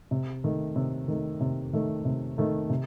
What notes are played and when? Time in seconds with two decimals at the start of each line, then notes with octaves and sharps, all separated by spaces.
0.11 C3
0.44 D#3 A3
0.76 C3
1.08 D#3 A3
1.41 C3
1.73 D#3 A3
2.05 C3
2.38 D#3 A3
2.70 C3